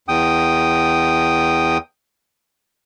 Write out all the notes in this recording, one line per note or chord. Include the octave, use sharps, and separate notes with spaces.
E2 G5 D#6